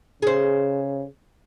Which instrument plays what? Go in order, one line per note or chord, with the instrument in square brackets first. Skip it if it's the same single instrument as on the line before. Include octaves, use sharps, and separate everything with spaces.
[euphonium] C#3 [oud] G#4 C5